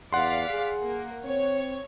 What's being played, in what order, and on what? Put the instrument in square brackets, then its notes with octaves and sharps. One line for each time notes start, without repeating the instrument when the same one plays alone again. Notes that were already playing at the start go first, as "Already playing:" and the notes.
[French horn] E2 [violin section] D5 F5 B6 [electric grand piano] F#5 C6
[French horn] G#4
[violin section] A#3
[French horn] C4 [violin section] C#5